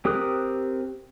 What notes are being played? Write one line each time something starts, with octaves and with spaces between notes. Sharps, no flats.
C4 G4 A#4 D#6 F#6